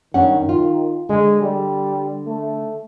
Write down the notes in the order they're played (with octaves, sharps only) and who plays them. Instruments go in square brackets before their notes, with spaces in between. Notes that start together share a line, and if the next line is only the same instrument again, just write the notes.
[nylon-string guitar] G2 C#4 F#5 [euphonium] D#3
[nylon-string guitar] F4
[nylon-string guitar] D3 [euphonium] G#3
[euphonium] G3
A3